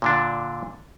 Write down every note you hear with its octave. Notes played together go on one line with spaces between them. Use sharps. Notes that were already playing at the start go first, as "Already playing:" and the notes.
A#2 D3 D4